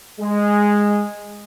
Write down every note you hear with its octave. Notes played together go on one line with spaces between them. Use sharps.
G#3